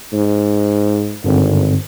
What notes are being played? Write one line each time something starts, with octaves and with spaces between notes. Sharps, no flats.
G#2
G#1 G2 D3 C4